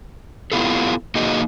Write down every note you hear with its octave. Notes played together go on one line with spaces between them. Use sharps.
B3 E4 F4 G4 A4
A#3 D#4 F#4 G#4 D#5